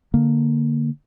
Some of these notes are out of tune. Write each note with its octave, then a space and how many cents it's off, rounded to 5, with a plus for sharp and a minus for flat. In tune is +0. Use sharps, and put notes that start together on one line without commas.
D3 +0 A#3 +0